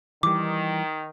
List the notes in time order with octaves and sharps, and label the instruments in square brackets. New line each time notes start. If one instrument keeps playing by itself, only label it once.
[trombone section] D#3 [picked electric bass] E3 G3 [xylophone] D6